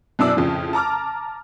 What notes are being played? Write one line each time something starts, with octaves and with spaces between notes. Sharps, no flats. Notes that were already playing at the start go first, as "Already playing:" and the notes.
F#2 B2 D4 E4 D5 E6
F2 A2 C#3 F3
A5 A#5 D6 F6